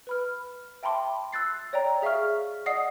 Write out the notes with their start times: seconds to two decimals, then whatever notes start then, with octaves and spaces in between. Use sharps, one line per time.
0.07 B4 B5 F6
0.83 E5 G5 A5 B5 C6 D6
1.33 E6 F#6 A6 C7
1.73 C#5 D5 G5 A#5
2.02 G#4 E5 F5 C#6 F6
2.66 D5 D#5 F#5 D#6 C7